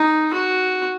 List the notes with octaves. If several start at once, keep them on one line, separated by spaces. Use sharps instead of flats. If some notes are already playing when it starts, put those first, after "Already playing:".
Already playing: D#4
F#4